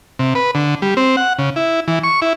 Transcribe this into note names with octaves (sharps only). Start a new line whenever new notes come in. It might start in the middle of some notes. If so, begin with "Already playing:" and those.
C3
B4
D3
G3
C4
F#5
C#3
E4
E3
C#6
E4